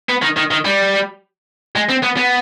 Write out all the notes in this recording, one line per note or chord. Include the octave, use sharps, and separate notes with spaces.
B3
D#3
D#3
D#3
G3
G#3
C4
B3
B3